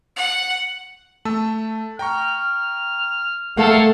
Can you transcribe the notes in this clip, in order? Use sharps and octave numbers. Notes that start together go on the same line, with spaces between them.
F#5
A3 A5 E6
G5 A#5 C#6 F6
A3 A#3 A4 F5 F#5